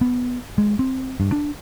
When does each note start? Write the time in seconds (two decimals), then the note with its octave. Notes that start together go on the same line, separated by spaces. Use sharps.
0.01 B3
0.58 G#3
0.79 C4
1.20 G2
1.32 D4